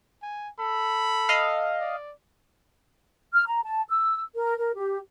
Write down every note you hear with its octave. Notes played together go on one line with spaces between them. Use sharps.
G#5
A4 B5
D#5 F5
D5
F6
A#5
A5
E6
A#4
A#4
G4